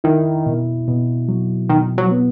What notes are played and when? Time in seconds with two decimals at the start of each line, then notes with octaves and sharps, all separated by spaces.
0.04 D#3 E4
0.46 B2
0.88 B2
1.29 F#3
1.69 B2 D#3
1.98 F#3
2.11 B3